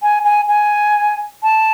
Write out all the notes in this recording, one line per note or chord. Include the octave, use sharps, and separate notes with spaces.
G#5
G#5
G#5
A5